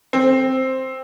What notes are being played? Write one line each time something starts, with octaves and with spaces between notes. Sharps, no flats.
C4